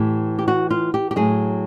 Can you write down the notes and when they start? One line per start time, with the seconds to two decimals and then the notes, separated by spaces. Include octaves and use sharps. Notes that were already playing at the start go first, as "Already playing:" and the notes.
Already playing: A2 E3 G4
0.39 G4
0.48 F#4
0.71 F4
0.94 G4
1.11 G4
1.16 A2 F#3 G#4